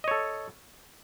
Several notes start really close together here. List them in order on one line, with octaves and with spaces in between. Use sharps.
D#5 C#5 A4